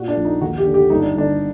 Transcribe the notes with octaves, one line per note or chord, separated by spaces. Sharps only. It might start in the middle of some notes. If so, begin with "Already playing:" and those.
Already playing: A#2 F#4
D4
A#1
D#4
D#2 F#4
G4
D3
G4
G1 D#4
D4
G1 D4